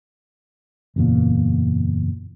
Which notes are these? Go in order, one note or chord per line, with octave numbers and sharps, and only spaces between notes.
F#1 E2 A#2